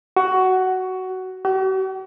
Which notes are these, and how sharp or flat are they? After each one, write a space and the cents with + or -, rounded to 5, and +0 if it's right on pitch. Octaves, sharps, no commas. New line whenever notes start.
F#4 +10
F#4 +45